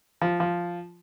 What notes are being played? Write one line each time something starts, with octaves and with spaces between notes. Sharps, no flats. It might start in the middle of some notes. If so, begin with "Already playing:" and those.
F3
F3